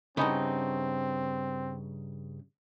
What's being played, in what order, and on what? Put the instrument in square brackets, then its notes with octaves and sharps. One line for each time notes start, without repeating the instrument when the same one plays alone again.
[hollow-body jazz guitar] G2 C#3 [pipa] E3 B3 D#4 [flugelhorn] C4